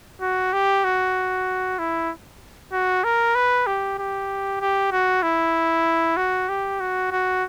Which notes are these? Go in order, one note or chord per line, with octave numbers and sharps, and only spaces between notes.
F#4
G4
F#4
E4
F#4
A#4
B4
G4
G4
G4
F#4
E4
F#4
G4
F#4
F#4